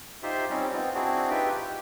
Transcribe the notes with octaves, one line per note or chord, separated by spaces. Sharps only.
D#4 F4 G4 C5 E5 C6
G3 C4 C#4 D#4
B3 C4 D#4 F4
C4 D4 E4 F#4 G#4
D#4 F4 G4 B4 E5 G5
G4